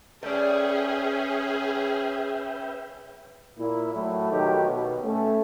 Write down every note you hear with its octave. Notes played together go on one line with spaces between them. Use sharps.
C#4 G#4 A4 B4 D5 E5 G5
A#2 E4
A2 F#3 A3
B1 D#3 F#3 A3 B3 G4
B2
A3 C#4